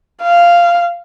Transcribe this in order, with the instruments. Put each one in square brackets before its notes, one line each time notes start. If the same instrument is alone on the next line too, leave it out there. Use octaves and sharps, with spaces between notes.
[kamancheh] F5